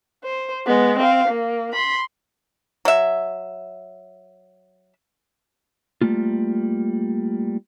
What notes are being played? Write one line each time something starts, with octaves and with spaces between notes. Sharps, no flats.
C5
G#3 B3
C4 F5
A#3
B5 C6
F#3 E5
G3 A3 A#3 F4